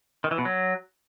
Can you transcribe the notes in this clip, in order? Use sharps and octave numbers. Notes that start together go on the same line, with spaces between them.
D#3
E3
B2
F#3